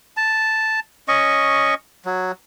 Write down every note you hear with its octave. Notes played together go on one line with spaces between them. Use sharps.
A5
C#4 D#5 C#6
F#3